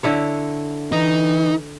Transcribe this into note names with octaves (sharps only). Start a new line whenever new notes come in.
D3 E4 C#5
E3 D#4